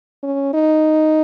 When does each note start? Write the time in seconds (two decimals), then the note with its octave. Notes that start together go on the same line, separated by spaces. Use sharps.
0.23 C#4
0.54 D#4